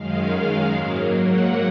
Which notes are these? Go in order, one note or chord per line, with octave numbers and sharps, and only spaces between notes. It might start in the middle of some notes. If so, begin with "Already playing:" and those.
Already playing: F#2 D#3 G#3 F5
G#2 F#3 A#3
F#5